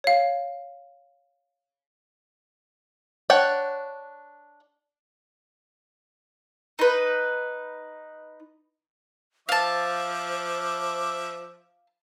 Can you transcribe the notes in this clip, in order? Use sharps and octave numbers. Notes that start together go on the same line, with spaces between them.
C#5 F5
D4 C#5 F#5 G5
D#4 B4
F3 C5 E5 F5 A5 D6